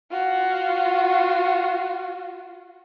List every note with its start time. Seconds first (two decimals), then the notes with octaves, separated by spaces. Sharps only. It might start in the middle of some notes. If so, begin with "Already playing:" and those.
0.11 F4 F#4